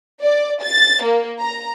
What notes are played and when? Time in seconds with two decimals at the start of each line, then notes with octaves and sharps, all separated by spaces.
0.24 D5
0.63 A6
1.04 A#3
1.40 A#5